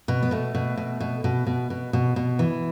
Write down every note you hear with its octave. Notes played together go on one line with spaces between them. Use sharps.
B2
B3
B2 A3
B2
B2
B2
B2
B2
B2
B2
B2
E3